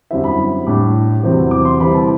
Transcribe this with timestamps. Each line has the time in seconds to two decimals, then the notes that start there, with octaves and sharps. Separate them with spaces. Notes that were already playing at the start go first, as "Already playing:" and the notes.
0.11 F#2 D3 G3 C4 E4 E5
0.24 B5
0.67 A2 G3 D4 D6
1.23 E2 C3 F#3 C4 E4
1.51 D6
1.65 C6
1.80 C3 E3 G3 C4 E4 B5
1.94 A5